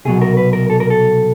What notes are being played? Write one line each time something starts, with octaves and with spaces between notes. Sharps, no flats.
C2 B2 F#3 G#4
A#4
B4
A#4
A4
A#4
A4